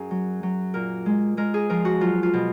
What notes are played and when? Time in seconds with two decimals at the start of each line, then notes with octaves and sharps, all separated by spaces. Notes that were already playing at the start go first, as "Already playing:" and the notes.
Already playing: F#2 G#4
0.11 F#3
0.43 F#3
0.74 A#2 A#4
1.06 G#3
1.37 G#3 A#4
1.54 G#4
1.70 F3 A#4
1.85 F#4
2.01 F#3 F4
2.23 F4
2.33 B2